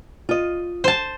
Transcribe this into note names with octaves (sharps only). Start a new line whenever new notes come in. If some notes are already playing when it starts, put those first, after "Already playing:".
F4 D#5
C5 A5